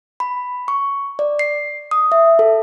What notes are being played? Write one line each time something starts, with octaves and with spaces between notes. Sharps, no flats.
B5
C#6
D5
C7
D#6
E5
A4